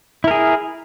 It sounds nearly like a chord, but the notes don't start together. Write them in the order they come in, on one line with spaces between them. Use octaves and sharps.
E4 A#4 G#4